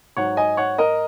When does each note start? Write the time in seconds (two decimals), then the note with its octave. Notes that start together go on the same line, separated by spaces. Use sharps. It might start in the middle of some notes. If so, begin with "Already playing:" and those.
0.17 G#2 F#3 C#5 F#5
0.37 D#5 G#5
0.57 C#5 F#5
0.78 A#4 D#5